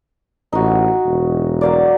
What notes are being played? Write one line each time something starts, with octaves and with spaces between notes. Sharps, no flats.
A1 D#4 F#4
E1
F#3 A#3 D5